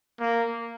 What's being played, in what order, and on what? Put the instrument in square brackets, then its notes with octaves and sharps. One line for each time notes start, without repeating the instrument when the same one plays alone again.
[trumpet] A#3